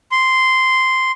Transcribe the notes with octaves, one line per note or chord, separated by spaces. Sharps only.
C6